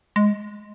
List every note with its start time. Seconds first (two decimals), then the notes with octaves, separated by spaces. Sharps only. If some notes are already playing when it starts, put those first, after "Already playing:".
0.16 G#3